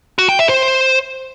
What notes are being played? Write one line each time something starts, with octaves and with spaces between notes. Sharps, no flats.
F#4
G5
E5
C5